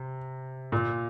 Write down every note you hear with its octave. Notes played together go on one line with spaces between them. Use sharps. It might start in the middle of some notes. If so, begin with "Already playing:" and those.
Already playing: C3
A#2